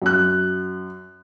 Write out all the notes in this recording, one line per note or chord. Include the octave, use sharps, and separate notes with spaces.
F#2 F#6